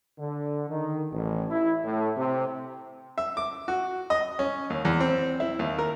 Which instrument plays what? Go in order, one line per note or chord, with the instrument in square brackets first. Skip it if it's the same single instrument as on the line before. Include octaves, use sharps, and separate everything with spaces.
[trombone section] D3
D#3
A1
E4
A2
C3
[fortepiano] E5
D6
F#4
D#5
C#4
D#2
E2
C4
E4
D#2
A#4